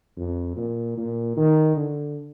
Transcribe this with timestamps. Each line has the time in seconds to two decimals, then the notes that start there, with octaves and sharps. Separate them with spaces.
0.17 F2
0.57 A#2
0.97 A#2
1.37 D#3
1.76 D3